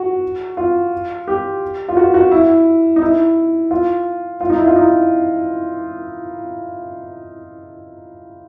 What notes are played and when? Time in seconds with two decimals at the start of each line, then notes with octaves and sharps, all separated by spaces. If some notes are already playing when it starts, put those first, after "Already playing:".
Already playing: F#4
0.57 F4
1.28 G4
1.89 F4
1.97 F#4
2.14 F#4
2.31 E4
2.96 D#4
3.02 E4
3.71 F4
4.41 F4
4.50 D#4
4.58 E4
4.67 F4
4.76 D#4